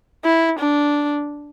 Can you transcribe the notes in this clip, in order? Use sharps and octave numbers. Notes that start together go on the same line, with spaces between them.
E4
D4